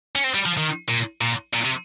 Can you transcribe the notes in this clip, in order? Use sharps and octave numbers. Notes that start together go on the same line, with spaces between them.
C#4
C4
G3
F3
D#3
A#2
A#2
A#2
C3